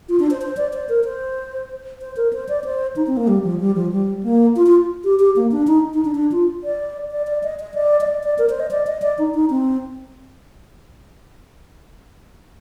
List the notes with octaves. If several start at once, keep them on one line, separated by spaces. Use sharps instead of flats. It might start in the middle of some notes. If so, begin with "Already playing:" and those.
F4
D4
C5
C5
D5
C5
A#4
C5
C5
A#4
C5
D5
C5
D#4
C4
A#3
G3
F3
G3
F3
G3
A#3
F4
F4
G4
G4
A#3
D4
D#4
D#4
D4
D4
F4
D5
D5
D5
D#5
D#5
D5
D#5
D5
D5
A#4
C5
D#5
D5
D#5
D5
D#4
D#4
C4